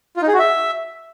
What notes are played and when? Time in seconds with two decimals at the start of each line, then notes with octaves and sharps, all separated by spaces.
0.17 F4
0.22 D#4
0.28 G#4
0.33 F#4
0.39 E5